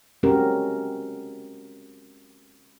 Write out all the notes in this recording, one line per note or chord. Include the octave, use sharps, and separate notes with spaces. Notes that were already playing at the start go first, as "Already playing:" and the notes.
G#3 C4 C#4 F#4 G4 A#4